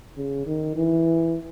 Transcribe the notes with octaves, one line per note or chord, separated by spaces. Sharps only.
C#3
D#3
E3